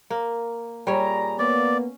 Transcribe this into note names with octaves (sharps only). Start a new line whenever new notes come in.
A#3
A#2 G3 G#4 C#5 A#5
A#3 B3 C#4 D5